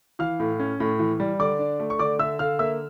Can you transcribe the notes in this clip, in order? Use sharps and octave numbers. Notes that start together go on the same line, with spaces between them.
E3 F5 F6
A2
C#4
A2
E3
G3
D3 D5 D6
D4
A3
C#6
D3 D5 D6
D3 E5 E6
D3 F5 F6
A#3 E5 E6